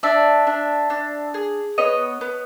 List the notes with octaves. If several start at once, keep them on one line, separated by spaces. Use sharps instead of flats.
D4 D5 E5
D4
D4
G#4
B3 C#5 D#5
B3